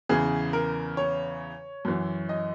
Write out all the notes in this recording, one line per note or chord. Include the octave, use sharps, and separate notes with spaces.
E2 C#3 E3 G#4
A#4
C#5
F#2 E3
D#5